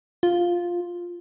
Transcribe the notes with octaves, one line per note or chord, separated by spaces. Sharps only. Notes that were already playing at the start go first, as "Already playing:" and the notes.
F4